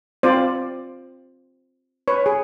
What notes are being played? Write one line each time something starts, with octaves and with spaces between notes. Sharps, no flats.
C4 F4 C5 D5
B4 C#5
G#4